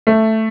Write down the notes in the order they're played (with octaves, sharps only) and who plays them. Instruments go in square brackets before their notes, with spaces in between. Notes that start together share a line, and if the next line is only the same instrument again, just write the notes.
[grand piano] A3